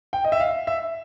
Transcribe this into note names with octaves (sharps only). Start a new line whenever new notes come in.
G5
D#5
E5
F5
E5